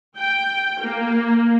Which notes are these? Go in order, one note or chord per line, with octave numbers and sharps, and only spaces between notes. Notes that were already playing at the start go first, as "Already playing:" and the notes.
G5
A#3